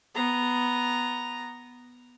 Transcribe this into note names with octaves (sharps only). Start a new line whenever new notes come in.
B3 A#5